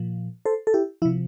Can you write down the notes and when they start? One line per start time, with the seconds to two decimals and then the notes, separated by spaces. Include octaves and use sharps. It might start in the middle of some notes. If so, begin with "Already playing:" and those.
Already playing: A#2 F3
0.46 A4 C5
0.67 A4
0.74 E4 G4
1.02 F3 E4
1.05 C3